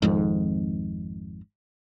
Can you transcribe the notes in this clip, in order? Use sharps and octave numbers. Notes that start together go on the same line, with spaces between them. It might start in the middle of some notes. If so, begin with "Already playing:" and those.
G#1 F2 G#2